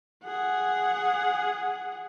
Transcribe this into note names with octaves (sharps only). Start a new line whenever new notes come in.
G#4 F#5